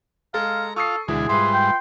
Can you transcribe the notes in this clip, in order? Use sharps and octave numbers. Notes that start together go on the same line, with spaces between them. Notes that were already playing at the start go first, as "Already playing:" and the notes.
G#3 A4 F5 A#5
F4 A4 C#6 D#6 C7
D2 B2 E3 G#3 E4 G#4
G#2 G3 F4 B4 E5 C6
G5